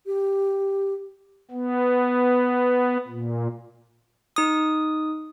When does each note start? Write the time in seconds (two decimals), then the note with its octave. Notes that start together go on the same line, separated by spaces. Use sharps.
0.07 G4
1.51 B3
3.08 A#2
4.36 D#4 D#6